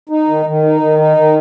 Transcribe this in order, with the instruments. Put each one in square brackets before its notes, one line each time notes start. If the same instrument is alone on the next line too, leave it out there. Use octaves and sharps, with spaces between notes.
[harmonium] D#4
D#3
D#3
D#4
D#3
D#4
D#3